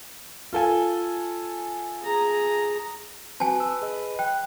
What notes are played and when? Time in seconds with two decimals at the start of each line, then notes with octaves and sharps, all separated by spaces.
0.53 F4 A4 G#5
2.02 G#4 A#5
3.40 C4 F#4 B4 G#5 A5
3.60 E6
3.82 G#4 D#5
4.19 G5 F#6